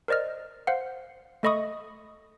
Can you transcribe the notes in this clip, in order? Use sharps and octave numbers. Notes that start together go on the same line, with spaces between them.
A#4 C5 D5 D#5 F6
C5 F5 F#5
A3 A4 D#5 B5 C#6 D#6